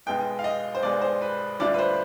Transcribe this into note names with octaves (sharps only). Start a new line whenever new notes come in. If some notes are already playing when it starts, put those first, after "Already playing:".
B1 B2 G#3 B3 G5
F5
D#5
C5
B1 B2 G#3 B3 D5
C5
B4
D2 D3 G3 D4 F4 D5
B4
C5